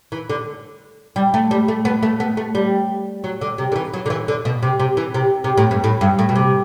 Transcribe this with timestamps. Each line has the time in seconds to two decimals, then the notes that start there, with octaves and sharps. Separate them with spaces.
0.12 E3
0.29 D3
1.16 G3
1.34 A3
1.51 G3
1.68 A3
1.85 B3
2.03 A3
2.20 B3
2.37 A3
2.55 G3
3.24 F#3
3.41 D3
3.58 C3
3.72 D3
3.76 E3
3.94 F#3
4.06 D3
4.10 E3
4.28 D3
4.45 B2
4.63 C3
4.80 C3
4.97 E3
5.14 C3
5.44 C3
5.58 A2
5.71 G2
5.84 A2
6.01 G2
6.19 A2
6.29 B2
6.35 C3